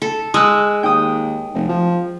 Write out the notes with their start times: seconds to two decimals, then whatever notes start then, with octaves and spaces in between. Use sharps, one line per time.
0.02 A4
0.34 G#3 D#6 E6 F#6
0.83 D#2 G5 D#6
1.54 F1
1.69 F3